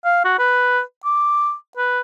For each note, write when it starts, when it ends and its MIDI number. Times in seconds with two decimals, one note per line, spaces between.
0.05 0.20 77
0.25 0.34 66
0.39 0.80 71
1.04 1.54 86
1.77 2.01 71